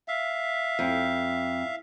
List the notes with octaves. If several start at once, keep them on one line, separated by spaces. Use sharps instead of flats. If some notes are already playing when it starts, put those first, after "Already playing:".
E5 F5
F2